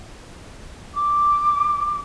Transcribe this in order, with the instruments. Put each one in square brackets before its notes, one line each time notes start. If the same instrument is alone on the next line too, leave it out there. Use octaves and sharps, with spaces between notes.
[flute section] D6